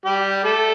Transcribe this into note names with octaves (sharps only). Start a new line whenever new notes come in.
G3 G4
A3 A4